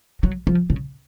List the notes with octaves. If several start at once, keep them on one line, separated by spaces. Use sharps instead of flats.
F#3
F3
C#3